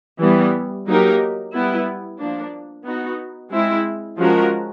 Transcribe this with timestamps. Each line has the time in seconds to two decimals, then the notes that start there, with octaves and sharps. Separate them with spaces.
0.20 E3 G3 B3
0.87 F#3 A#3 D#4 G4 A#4
1.53 G3 B3 E4
2.19 F3 A#3 D4
2.84 B3 D#4 F#4
3.51 G#3 C4 E4
4.17 F3 G#3 C#4 F#4 A#4